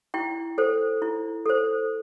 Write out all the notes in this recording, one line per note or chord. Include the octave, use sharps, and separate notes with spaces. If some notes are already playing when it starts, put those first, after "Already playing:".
E4 G5
A4 C5
E4
A4 C5